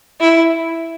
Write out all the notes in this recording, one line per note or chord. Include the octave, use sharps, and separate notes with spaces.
E4